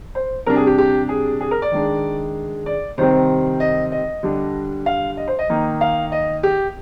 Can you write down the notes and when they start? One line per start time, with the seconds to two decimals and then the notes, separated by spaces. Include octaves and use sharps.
0.15 C5
0.46 C3 G3 D4 A#4
0.56 G#4
0.67 G4
0.78 G4
1.09 G#4
1.41 G#4
1.51 A#4
1.62 D5
1.71 D#3 G#3 D4
2.66 D5
2.98 C3 D#3 G3 C4 C5
3.60 D#5
3.92 D#5
4.23 D3 G3 D4
4.86 F5
5.17 D#5
5.28 C5
5.39 D#5
5.49 D#3 A#3 D#4
5.81 F5
6.12 D#5
6.43 G4